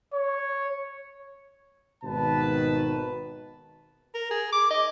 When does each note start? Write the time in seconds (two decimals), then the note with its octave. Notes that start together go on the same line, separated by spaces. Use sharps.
0.14 C#5
2.04 G#1 B2 D#3 B4 A5
4.14 A#4
4.31 G#4
4.52 D6
4.71 D#5